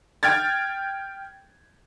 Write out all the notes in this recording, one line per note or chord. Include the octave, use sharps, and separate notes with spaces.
G5 F6 G#6 A6